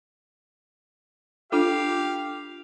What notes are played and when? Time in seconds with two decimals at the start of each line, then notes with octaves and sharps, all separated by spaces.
1.52 D4 F4 G4 A4 F5